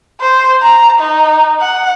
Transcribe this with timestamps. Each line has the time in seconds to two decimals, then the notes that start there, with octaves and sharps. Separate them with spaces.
0.21 C5
0.62 A#5
0.99 D#4
1.61 F#5